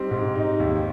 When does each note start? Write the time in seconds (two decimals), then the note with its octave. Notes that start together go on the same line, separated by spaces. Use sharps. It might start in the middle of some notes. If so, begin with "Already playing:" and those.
Already playing: G3 C4 D#4
0.11 G#2
0.35 D#4
0.60 D#2